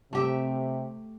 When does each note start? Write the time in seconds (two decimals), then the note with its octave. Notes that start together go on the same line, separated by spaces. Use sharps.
0.13 C3 A3 G4 E5